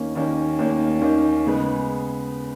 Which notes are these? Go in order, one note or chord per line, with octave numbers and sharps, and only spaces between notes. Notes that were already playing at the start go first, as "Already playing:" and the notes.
Already playing: D#2 D#3 A#3 C#4
D#2 D#3 A#3 C#4
D#2 D#3 A#3 C#4
D#2 D#3 A#3 C#4
C#3 G#3 B3